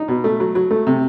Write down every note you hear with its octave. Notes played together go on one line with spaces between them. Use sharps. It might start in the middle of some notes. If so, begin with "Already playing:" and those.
Already playing: D#4
B2
A3
F#3
F#3
A3
C3